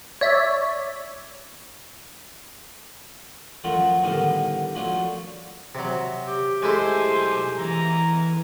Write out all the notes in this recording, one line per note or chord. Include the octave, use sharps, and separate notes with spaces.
C#5 D5 E5
F#2 F3 F#3 A3 F4 F#4
A2 D3 D#3 G3 B3 F5
F3 F#3 A3 C#4 D4
C3 F#3
G4
B1 G#3 A3 E4 C5 G#5
E2 E3 A#5